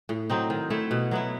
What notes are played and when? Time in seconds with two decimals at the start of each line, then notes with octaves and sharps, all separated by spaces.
0.09 A2
0.30 F#3 C4 D#4
0.50 D#3
0.70 A3 E4 A4
0.91 B2
1.11 F#3 B3 E4